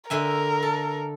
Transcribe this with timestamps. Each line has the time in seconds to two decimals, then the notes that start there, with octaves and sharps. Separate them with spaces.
0.10 D3 A#4 E5 G#5
0.63 A4